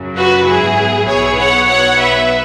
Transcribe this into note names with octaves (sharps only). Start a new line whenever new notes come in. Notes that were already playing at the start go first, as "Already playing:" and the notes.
Already playing: F#2 C#3 F#3
F#4 B4
G#2 F#3 B3 E4 G#4
B1 B2 B3 E4 G#4 C#5
C#5 F#5
B1 B2 F#3 B3 C#5 F#5
B4 E5